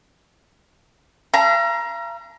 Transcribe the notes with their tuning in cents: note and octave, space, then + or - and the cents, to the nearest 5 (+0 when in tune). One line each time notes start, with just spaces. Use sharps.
F5 -45 A#5 +20